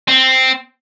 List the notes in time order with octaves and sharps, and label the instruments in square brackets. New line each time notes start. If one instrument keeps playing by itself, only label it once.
[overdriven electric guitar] C4